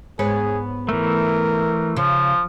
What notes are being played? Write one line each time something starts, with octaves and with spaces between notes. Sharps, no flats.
G#2 B3 G#4 C#5
E3 A3 A#4
C#3 F3